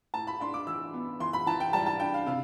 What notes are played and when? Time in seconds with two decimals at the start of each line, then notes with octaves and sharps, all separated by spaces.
0.14 A2 A5
0.27 B5
0.40 D4 C6
0.54 D6
0.67 E3 E6
0.94 B3
1.20 E3 C6
1.33 B5
1.46 E3 A5
1.60 G5
1.73 G3 A5
1.86 A5
2.00 D4 G5
2.14 F5
2.26 C3 F5